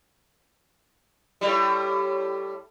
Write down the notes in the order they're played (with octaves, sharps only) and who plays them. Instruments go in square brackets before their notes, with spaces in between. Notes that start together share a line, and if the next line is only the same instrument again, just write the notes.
[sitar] A2 G3